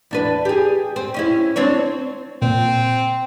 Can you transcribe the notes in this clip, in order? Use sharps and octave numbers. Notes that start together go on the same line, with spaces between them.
E2 D4 B4
G4 G#4
C4
C#4 D#4 E4
C4 D4 C#5
A#2 C4